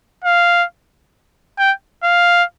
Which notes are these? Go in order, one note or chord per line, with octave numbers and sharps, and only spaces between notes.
F5
G5
F5